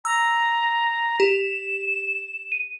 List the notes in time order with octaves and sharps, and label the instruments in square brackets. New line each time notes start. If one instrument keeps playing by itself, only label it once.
[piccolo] A#5 [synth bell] E6
[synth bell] G4 [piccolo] E7
[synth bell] D#7